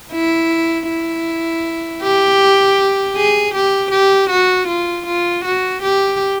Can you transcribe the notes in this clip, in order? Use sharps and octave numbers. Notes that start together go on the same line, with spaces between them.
E4
E4
G4
G#4
G4
G4
F#4
F4
F4
F#4
G4